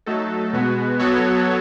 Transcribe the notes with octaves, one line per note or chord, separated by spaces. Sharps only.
F#3 A3 D#4 A4
B2 G#3 B3 F#4
F#3 B3 F#4 A4 C#5